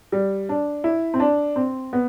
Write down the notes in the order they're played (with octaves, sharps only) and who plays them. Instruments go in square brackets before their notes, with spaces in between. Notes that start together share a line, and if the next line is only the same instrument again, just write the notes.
[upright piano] G3
D4
E4
C4
D4
C4
B3